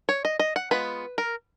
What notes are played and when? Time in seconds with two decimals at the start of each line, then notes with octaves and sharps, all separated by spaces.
0.09 C#5
0.25 D#5
0.40 D#5
0.56 F#5
0.71 G#3 B3 F4 B4
1.18 A#4